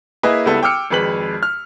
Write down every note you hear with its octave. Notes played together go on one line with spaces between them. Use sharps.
A#3 E4 G#4 B4 D#5 G#5
C#2 G3 B3 E4 A4 B4
G5 D6 E6 F6 C#7
G#1 F2 G#3 B4 B6 F#7
F6